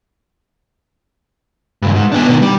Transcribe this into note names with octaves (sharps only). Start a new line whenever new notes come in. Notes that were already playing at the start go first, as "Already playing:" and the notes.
C#2 G2
G#2
B3 D4
B2 D#3
G3